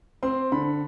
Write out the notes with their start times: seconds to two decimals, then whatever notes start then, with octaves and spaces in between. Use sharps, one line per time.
0.23 C4 C6
0.52 D3 B5